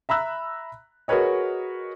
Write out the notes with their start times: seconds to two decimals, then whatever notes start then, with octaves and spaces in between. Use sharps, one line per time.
0.09 E5 A#5 B5 E6 F#6
1.08 F#4 G#4 A#4 B4 C#5 D#5